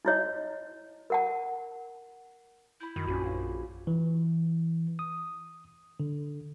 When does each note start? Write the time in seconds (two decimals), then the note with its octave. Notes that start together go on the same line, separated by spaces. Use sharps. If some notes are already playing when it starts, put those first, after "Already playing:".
0.05 D#4 E4 C#5 D#5
1.10 A#4 F#5 A5
2.81 E4 B5 G6
2.96 F#2 D#3
3.07 A#1 C#4 F4 F#4
3.87 E3
4.99 D#6
6.00 D3